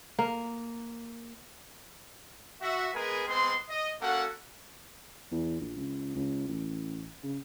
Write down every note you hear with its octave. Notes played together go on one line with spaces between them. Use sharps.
A#3
F#4 E5
G#3 B3 G#4 A#4 B4 G#5
G#3 B3 C4 C6
D#5
A#3 C#4 F#4 A4 F#5
E2
A#1
C#2
C#2
A1
C#3